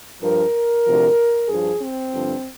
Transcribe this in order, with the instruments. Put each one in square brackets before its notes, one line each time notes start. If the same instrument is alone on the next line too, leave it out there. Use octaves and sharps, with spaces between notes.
[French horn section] G2 F3 A#4
D2 C3 F3
G2 F3 G#4
C4
G2 D3 F3